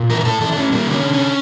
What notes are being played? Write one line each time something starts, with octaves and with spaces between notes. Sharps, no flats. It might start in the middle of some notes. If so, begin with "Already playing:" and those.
Already playing: A#2
E3 A#4
A#4
A2 A4
E3 A4
D4
A2 C#4
G3 A#3
D3
C#4
D3
C#4